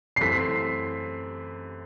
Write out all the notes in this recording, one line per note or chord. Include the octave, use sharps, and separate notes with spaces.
C7
F#2 E3 A3 C4 B6